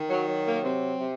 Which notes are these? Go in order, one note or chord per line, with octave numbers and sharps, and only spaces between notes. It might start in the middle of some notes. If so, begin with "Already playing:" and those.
Already playing: D#3
F#3
F#3
A#3
C3 C4
C3